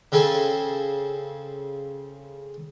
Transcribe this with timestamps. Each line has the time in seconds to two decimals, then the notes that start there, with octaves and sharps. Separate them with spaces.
0.12 C#3 C4 A4 G#5